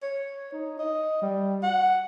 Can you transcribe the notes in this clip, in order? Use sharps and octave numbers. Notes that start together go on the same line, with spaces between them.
C#5
D#4
D#5
G3
F#5